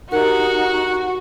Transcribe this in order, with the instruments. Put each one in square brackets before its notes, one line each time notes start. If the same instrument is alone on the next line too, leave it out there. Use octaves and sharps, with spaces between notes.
[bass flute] D#4 [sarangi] F#4 [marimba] G4 A#4 [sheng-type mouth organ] F#5